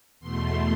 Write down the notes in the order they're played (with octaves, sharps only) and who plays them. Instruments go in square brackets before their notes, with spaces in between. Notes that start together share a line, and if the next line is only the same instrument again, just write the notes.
[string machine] E2 B2 A3 C6